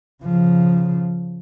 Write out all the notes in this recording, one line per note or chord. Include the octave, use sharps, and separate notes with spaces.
C#3 F3